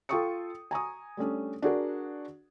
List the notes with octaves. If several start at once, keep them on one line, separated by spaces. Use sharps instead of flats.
F4 A4 G5 C#6 D#6 C#7
G#5 A#5 C#6 D#6
G3 A3 C#4 D4
D4 F#4 G#4 A#4